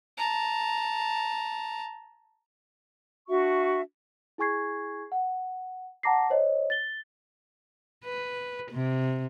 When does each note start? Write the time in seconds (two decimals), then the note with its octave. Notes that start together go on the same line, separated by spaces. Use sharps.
0.17 A5 A#5
3.27 D4 F#4 E5 C#6
4.38 E4 G#4 G#5 C#6 G#6 C7
5.12 F#5
6.03 F#5 A5 A#5 D6 A#6 C7
6.30 C5 C#5 D#5
6.70 A6 G7
8.04 B4
8.72 C3